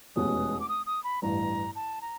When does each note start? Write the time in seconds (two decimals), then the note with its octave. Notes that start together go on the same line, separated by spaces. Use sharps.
0.16 F1 E2 B2 G#3 C#4 D#6
0.60 D6
0.69 D#6
0.86 D#6
1.04 B5
1.22 A1 G2 E3 A#5
1.76 A5
2.01 A#5